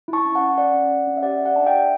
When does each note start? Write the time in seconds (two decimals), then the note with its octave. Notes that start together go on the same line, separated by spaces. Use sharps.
0.08 E4
0.13 A5 C#6
0.25 C#4
0.35 F#5 A5
0.41 C#4
0.57 C#4 D5 F#5
0.74 C#4
0.91 C#4
1.07 C#4
1.17 E5
1.23 G4 D5 F#5
1.40 G4
1.45 D5 F#5
1.56 D4 A5
1.67 E5 G5
1.73 G4